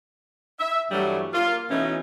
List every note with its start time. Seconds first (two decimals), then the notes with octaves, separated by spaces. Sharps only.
0.60 E5
0.91 G2 E3 F#3 G3 A3
1.33 A#3 F4
1.70 B2 E3 A3 C#4 D#4